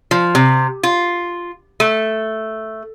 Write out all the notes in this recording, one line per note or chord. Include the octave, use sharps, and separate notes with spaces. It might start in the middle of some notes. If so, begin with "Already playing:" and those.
F3
C3
F4
A3